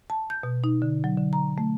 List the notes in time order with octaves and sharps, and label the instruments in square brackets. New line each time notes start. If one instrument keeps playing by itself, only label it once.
[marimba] A5
G6
B2
D#4
D3
F#3
D3
A#5
A3